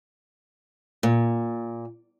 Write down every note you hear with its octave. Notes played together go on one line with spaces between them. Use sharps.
A#2